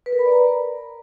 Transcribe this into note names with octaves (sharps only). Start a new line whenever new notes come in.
B4
A#4
B5
D5
A#5